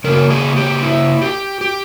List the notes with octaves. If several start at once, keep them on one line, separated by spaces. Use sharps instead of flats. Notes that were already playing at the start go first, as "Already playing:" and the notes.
C#3 E3 A#3 A#4
G#4
G4
E4
G4
G4